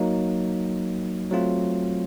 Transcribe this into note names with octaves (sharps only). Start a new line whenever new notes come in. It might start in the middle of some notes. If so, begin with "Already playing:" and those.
Already playing: F#3 A#3 D#4
F#3 A3 C4 F4